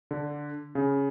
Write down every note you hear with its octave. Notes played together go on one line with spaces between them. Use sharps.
D3
C#3